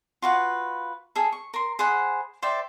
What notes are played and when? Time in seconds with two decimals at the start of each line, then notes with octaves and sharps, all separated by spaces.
0.22 F4 F#4 B4
1.16 G#4 A4
1.32 C#6
1.54 A#4 C6
1.79 G#4 C5 F#5 B5
2.42 C5 D5 E5 G5